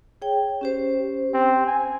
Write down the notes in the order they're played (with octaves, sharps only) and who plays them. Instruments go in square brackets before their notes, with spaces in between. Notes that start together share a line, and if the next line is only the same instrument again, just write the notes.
[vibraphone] G#4 C#5 G5
C#4 G4 C5
[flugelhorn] C4
G#5